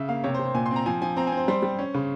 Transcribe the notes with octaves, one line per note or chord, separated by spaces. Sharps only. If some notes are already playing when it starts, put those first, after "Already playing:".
Already playing: C#3 E5
A#3 F5
C3 C#5
C5
C3
C5
A#2 G#5
C6
C4
A#5
F3 G#5
F3 G#5
C4 A#5
G#5
C4
C5
G3 C5
G3
C#4
C#3